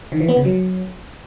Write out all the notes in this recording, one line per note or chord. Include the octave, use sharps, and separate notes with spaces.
D#3
E3
B3
C#3
F#3